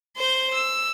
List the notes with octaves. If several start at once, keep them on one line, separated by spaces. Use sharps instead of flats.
C5 G6
E6